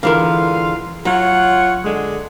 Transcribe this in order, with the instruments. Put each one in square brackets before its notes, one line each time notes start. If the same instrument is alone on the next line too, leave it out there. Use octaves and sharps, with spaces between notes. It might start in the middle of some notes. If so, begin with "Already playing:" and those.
[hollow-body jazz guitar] D3 E3 A#4 [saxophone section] G#3 F4 F5
[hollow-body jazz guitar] F#3 [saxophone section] F4 C#5 F#5
[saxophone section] D3 G#3